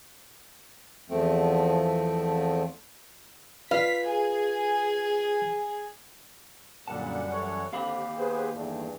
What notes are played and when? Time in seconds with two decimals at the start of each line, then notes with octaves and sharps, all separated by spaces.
1.10 E2 F3 A3 C4
3.71 F4 B4 F5 B6
4.06 G#4
6.88 F#2 A#2 D3 G3 F#5 A5
7.31 E3 A4 C#5
7.73 D#2 D3 C4 G4 F5 B5
8.17 B3 G4 G#4 B4 C5
8.54 E2 G2 A3